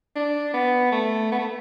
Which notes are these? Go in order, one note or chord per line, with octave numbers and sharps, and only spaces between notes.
D4
B3
A3
B3
A3